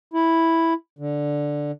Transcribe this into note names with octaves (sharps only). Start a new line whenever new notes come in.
E4
D3